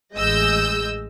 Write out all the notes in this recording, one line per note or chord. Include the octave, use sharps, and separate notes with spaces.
A1 G#3 D#5 E6 G6